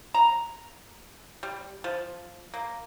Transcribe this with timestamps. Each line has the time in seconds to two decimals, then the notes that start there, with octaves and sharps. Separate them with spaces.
0.14 A#5
1.43 G3
1.84 F3
2.54 A#3